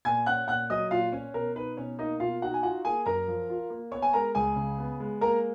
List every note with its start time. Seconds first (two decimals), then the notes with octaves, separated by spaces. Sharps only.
0.05 A#2 G#5 G#6
0.26 C#4 F#5 F#6
0.48 A#2 F#5 F#6
0.70 F#3 D#5 D#6
0.91 A#2 F4 F5
1.12 C#4 C#5
1.34 B2 A#4
1.55 D#4 B4
1.77 B2 C#4 C#5
1.98 A#3 D#4 D#5
2.20 B2 F4 F5
2.42 D#4 F#4 F#5
2.54 G#5
2.63 F4 F#4 F#5
2.84 A#3 G#4 G#5
3.06 F#2 A#4 A#5
3.28 F3
3.50 F4
3.70 A#3
3.92 B3 C#5 C#6
4.02 G#5
4.13 G#3 A#4 A#5
4.35 C#2 G#4 G#5
4.56 C#3
4.78 B3
5.00 G#3
5.21 A#3 A#4 A#5